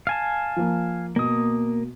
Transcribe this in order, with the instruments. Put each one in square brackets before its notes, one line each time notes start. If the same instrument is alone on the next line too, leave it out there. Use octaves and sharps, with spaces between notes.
[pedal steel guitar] F5 G#5 A5
[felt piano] F3 A#3
[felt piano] B2 [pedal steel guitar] A#3 D#6